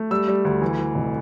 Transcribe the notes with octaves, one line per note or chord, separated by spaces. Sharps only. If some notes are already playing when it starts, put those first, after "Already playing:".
Already playing: A3
G3 E6
G3
D2
E3
E3
F1